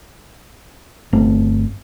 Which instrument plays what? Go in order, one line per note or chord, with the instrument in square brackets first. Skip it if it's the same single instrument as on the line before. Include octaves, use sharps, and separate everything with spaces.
[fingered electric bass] G1 A3 C4